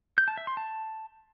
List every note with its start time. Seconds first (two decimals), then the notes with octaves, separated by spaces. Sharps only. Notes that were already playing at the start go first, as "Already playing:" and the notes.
0.18 G6
0.28 A5
0.37 E5
0.47 C6
0.57 A5